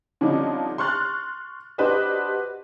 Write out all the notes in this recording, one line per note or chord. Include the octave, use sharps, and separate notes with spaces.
D3 F3 G3 C4 C#4 D#4
C6 C#6 F6 F#6 A6
D4 F#4 G4 B4 C5 D#5